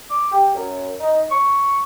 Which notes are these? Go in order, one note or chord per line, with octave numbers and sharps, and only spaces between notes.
D6
G4
F#2
D#4
C#6